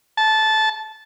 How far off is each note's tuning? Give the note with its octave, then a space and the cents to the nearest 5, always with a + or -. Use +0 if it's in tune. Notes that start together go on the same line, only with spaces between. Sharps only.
A5 -15